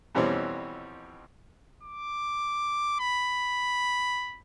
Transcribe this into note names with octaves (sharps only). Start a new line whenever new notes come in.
F2 B2 E3 G3 C4 C#4
D6
B5